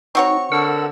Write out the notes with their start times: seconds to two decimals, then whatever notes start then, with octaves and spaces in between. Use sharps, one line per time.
0.15 C4 D#4 F#4 C#5 C#6
0.52 D3 A#4 F#5 E6